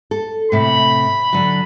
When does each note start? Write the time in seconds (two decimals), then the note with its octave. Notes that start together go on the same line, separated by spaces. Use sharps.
0.11 A4
0.52 A2 C3 B5
1.33 D3 F#3